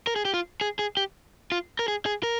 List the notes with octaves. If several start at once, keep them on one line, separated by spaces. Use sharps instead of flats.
A#4
G#4
G4
F4
G#4
G#4
G4
F4
A#4
G#4
G#4
A#4